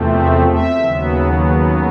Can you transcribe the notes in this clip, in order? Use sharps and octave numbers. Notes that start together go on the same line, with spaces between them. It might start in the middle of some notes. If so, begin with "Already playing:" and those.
Already playing: E2 C3 F3 A3 C4
E5
E5
D#2 C#3 F#3 B3